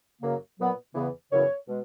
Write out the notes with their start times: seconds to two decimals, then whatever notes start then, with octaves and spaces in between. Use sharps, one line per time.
0.22 F#2 C#3 F#3 A#3
0.58 A#2 F#3 B3
0.95 E2 C#3 E3 B3
1.31 F#2 C#3 E3 B3 C#5
1.68 B2 G#3